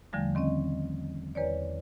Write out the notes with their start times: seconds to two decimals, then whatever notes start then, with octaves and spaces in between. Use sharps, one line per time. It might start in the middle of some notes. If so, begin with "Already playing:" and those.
0.13 E2 D3 F3 G3 A3
0.35 D#3 C4 C#4 D#5
1.35 E2 B4 C#5 D5